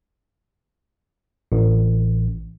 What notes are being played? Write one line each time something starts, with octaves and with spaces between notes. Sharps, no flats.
A1